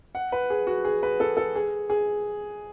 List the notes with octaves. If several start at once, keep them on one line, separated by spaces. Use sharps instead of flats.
F#5
B4
G#4
F#4
G#4
B4
A4
A4
G#4
G#4